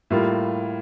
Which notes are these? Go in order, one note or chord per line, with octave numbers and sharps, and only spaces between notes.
A2 G3 A#3 F4